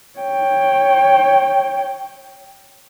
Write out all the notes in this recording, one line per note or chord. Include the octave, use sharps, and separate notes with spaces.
C#5 G5